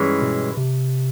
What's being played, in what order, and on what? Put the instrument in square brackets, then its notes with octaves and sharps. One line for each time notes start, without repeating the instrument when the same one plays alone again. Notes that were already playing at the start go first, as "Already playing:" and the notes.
Already playing: [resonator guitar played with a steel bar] G2 E3 G#3 C#4
[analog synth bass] B2
C3